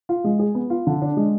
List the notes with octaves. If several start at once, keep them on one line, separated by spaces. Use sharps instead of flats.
F4
G#3
G#4
B3
F4
D3
D4
G#3